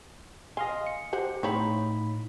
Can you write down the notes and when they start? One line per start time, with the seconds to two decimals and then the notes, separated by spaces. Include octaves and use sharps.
0.57 D#5 F5 G#5 C6
0.87 C#7
1.13 G4 C5 F#5
1.43 A2 C4 D#4 C#5 F5 B5